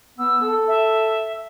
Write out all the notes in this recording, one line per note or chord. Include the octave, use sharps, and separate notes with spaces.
B3 E6
A4
E5